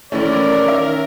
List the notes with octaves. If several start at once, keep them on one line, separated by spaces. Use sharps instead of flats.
A#1 E3 A3 C#4 A#4 D5
D#3 E5